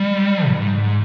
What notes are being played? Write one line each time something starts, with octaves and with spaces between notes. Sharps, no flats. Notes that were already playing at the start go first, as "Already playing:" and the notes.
Already playing: G3
G#2